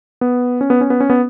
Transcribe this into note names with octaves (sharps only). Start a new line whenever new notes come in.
B3
C#4
B3
C#4
B3
C#4
B3